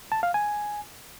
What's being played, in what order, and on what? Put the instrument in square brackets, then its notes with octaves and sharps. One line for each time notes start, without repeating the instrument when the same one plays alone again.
[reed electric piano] A5
F5
G#5